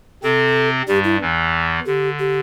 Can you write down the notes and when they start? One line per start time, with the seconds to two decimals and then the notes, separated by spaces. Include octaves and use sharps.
0.23 C3 C4 A4
0.88 G2 G3 G4
1.04 E4
1.20 E2 E3
1.86 D3 G4
2.19 G4